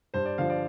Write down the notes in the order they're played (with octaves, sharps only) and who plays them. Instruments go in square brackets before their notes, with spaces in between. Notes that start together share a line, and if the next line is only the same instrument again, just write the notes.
[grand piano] G2 [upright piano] C5
[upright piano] D5
[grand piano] D3 F3 [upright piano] F5
[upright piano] D5